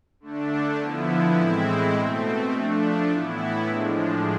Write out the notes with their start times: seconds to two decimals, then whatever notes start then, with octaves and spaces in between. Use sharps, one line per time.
0.20 D3 A3 D4
0.78 D3 F3 B3 E4
1.37 A2 E3 G#3 C4 E4
1.95 B2 A3 C4
2.52 F3 A3 D4
3.11 A2 E3 B3 E4
3.70 A2 F3 G#3 D4